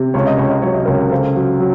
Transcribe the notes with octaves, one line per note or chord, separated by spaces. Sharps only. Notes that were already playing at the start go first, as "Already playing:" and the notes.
Already playing: C3
C#2 C#5
D#5
C#2 C#5
D#5
F#3 C#5
D#5
C#2 A#4 C#5
C#3 A4 C5
F#3
F#3